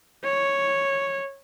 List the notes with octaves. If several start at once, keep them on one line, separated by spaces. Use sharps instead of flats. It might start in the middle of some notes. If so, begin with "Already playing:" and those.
C#5